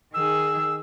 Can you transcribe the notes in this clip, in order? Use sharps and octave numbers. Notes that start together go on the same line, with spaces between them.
D#3 G#4 E6